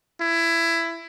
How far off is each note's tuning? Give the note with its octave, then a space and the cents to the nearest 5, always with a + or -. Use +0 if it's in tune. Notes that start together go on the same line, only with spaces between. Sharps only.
E4 +15